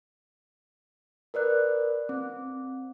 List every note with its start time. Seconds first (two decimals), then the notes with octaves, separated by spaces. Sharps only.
1.34 A#4 B4 D5 F#6
2.09 C4